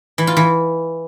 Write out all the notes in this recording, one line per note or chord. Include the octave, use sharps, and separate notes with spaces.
E3
F4
E3